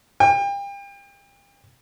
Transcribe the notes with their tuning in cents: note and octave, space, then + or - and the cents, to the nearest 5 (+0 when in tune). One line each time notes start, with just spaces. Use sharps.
G5 +35